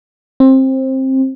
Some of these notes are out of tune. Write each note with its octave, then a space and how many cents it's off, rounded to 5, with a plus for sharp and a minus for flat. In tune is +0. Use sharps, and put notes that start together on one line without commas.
C4 +20